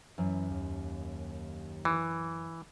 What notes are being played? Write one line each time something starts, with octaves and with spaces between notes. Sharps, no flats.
F#2 E3
D#2
E3